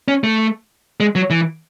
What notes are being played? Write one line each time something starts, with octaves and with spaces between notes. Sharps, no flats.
C#4
A3
G#3
F#3
E3